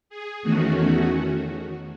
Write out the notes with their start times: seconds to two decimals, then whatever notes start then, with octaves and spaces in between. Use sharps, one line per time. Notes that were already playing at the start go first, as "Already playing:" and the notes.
0.10 G#4
0.42 E2 D#3 A3 C#4 F#4
0.76 F#4